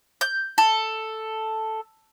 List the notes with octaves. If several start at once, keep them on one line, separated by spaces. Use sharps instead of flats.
G6
A4